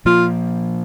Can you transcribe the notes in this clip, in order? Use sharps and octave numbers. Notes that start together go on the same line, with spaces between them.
A#2 F3 A#3 F4